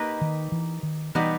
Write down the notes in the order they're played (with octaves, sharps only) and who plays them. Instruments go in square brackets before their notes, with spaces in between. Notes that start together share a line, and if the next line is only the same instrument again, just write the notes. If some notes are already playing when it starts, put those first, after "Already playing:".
Already playing: [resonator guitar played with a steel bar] A#3 D#4 G4 B4 D#5
[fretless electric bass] D#3
E3
D#3
[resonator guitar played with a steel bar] B2 G3 B3 D#4 G4 [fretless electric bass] E3